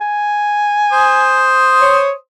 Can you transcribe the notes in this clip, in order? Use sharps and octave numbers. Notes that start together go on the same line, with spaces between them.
G#5
C5 D#6
C#5